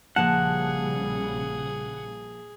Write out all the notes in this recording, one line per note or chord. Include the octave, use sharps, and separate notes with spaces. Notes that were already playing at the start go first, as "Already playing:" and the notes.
A#1 C#3 F3 G3 A#3 G#4 F#5 A5